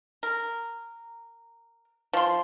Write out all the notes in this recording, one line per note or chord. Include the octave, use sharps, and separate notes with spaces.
A#4
F3 C6